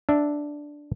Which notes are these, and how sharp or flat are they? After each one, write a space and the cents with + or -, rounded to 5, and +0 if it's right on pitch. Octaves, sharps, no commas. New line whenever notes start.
D4 +0 E5 +0